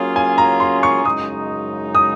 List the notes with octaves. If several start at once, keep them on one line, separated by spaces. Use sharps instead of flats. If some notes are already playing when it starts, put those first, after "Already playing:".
Already playing: F#3 A#3 C#4 F4 G#4
G#5
A#5
C6
C#6
F#2 C#3 G#3 D#4 D#6
D#6